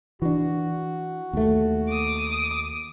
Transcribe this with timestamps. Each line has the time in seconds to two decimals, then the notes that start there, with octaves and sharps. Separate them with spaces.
0.22 E3 D4 F#4
1.33 D#2 A3
1.90 D6 D#6